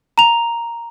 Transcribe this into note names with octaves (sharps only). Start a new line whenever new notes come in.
A#5 F7